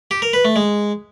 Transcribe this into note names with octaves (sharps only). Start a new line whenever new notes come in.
G4
A#4
B4
A3
G#3